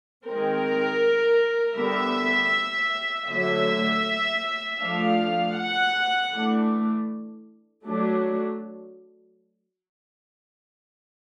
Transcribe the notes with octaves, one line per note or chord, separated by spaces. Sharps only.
D#3 G#3 C4 A#4
D3 G3 B3 E5
D3 F#3 A3 E5
F3 A3 D4 F5
F#5
E3 A3 D4
F#3 A3 D4